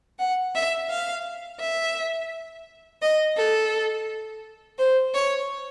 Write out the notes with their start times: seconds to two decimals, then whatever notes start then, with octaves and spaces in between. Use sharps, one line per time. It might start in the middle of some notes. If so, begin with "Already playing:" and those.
0.19 F#5
0.54 E5
0.89 F5
1.60 E5
3.01 D#5
3.36 A4
4.78 C5
5.13 C#5